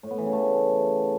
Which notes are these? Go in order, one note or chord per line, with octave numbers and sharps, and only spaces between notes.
A2
B3
E3
C#3
A3